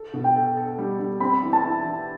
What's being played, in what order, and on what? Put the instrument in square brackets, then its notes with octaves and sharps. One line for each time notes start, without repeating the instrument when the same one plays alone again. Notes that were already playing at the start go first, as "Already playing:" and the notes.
Already playing: [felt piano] A4
B2
[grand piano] G5
[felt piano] A4
A4
G3
G3
[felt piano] C4 [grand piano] B5
[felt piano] E3
[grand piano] A5
[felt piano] E4
E3